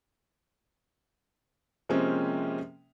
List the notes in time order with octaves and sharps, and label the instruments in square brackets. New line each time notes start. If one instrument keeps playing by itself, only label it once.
[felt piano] C3 F3 G#3 A#3 C4 C#4